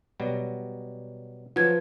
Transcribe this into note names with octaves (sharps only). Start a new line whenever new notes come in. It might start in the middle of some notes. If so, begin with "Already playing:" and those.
B2 F#3 G3
F3 F#3 B4 G#6